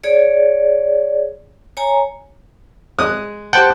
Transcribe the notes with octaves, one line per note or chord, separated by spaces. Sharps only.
G#4 C#5 D5
C#5 G#5 A#5
G#3 D#6 F#6
G4 C5 F#5 G5 A5